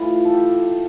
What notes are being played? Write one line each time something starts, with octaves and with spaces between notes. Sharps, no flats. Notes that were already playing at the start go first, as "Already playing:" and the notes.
Already playing: A2 E3 F4
A4
G4